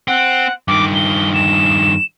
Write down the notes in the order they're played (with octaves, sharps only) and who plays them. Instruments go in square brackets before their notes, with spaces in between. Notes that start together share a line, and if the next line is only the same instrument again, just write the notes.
[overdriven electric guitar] C4 [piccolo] F#5
[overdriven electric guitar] G2 D#3 [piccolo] D6
[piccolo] G7
E7